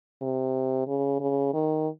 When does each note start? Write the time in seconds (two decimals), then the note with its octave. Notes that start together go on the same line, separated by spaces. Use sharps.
0.22 C3
0.87 C#3
1.20 C#3
1.53 D#3